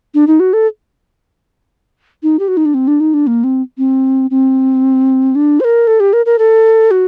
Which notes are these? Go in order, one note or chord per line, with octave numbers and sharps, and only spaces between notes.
D4
D#4
F#4
A4
D#4
G4
F#4
D#4
D4
C4
D4
D#4
D4
A#3
C4
C4
C4
D4
C5
A#4
A4
G4
A#4
A#4
A4
F#4